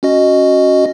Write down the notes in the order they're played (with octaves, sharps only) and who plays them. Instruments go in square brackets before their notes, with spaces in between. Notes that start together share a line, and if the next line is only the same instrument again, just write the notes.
[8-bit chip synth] C#4 F#4 D#5